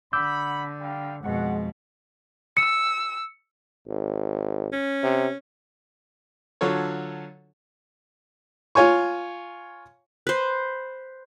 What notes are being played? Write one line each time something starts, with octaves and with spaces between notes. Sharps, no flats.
D3 F#5 B5 D6 E6 G6
G3 F5 G5
F2 B2 G#3 F#5
E6 C#7
G#1
C#4
C3
D3 F#3 F4 A4 C#5
F4 C#5 G#5 C#6
B4 C5